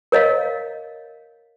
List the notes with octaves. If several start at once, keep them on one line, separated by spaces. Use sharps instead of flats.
A#4 C#5 D#5 F5